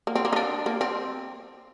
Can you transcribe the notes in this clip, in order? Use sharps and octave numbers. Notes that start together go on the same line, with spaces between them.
A#3
C4
A#3
D#4
D4
A#3
C4